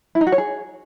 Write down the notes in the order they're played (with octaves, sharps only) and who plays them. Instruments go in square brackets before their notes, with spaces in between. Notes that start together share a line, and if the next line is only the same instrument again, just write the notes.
[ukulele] E4
D#4
F#4
C#5
G#4